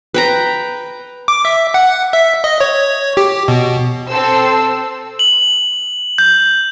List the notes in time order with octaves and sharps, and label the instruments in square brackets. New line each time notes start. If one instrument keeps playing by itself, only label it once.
[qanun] B4 G5 A#5
[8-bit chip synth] D6
E5
F#5
E5
D#5
C#5
G4
B2
[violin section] C4 A4 C5 E6 C7
[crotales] F#7
G6